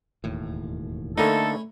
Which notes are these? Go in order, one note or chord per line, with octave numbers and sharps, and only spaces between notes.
E1 D#2 A2
D3 A3 A#3 C#4 D#4 E4 A4